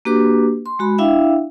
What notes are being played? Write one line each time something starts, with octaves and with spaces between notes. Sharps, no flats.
A#3 D4 F#4 G4 B4 D6
C6
G#3 F#4 B5
D4 E4 E5 F5 G5